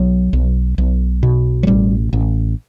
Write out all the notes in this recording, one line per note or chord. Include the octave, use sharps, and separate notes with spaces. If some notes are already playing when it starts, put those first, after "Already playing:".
Already playing: B1 F#3
B1
B1
B2
F#3
A1 G3
A1